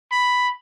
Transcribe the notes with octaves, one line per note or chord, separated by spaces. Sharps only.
B5